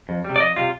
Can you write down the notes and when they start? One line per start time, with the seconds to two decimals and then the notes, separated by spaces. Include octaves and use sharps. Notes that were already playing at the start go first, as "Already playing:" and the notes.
0.09 F2
0.25 G3
0.30 C3
0.36 D5
0.40 F2 D#5
0.56 C3 G3 F4